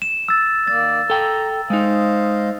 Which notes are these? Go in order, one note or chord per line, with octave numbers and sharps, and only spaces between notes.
E7
E6 A6
D#3 A#3 D5 A6
A4 G5 A#5
G#3 D#4 C5 D#5 F5